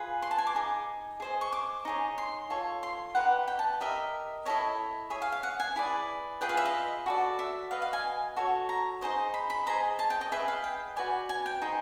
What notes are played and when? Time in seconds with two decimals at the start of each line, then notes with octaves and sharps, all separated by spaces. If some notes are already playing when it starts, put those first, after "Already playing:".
Already playing: F4 G#4 B4
0.22 C6
0.31 A5
0.38 G#5
0.47 D6
0.55 D#4 G#4
1.20 G#4 C5 D#5
1.41 C#6
1.52 D6
1.85 D#4 G#4 C#5
2.18 C6
2.50 F4 A4 C#5
2.83 C6
3.15 D#4 G4 B4 F#5
3.48 G5
3.59 A5
3.80 G4 A#4 D#5 E5
4.45 E4 A4 C#5 D#5
5.10 G#4 C#5 E5
5.22 F5
5.32 F5
5.43 F#5
5.60 G#5
5.76 E4 G#4 B4 D5
6.41 F4 G#4 B4 G5
6.49 F5
6.57 E5
6.66 D#5
7.06 F#4 A4 D5
7.39 E5
7.71 F#4 B4 D#5 F5
7.82 F5
7.93 G#5
8.36 F#4 A4 C#5
8.69 A#5
9.01 D#4 G#4 C5 D#5
9.34 B5
9.50 B5
9.66 G#4 C5 D#5 A#5
9.99 A5
10.10 G5
10.21 D#5
10.32 G#4 B4 D#5 E5
10.48 F5
10.64 G5
10.96 F#4 B4 D5 G#5
11.29 G#5
11.46 G5
11.62 D#4 G#4 C5